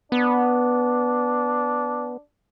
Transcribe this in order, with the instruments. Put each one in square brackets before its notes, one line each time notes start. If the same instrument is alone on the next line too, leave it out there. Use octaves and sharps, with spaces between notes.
[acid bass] B3 [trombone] D4